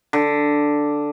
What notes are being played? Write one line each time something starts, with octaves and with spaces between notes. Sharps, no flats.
D3